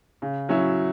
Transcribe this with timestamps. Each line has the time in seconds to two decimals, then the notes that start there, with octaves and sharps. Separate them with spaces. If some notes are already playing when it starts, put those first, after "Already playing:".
0.22 C#3
0.49 F#3 C#4 E4